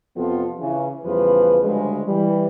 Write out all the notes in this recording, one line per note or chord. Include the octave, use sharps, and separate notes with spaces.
F2 C3 F3 B3 F4 A4
C#3 E3
E2 C#3 F3 G3 B4
D2 C#3 F3 G3 G#3
E3 G3